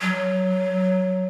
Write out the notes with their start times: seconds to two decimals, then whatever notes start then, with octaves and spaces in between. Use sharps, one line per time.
0.01 F#3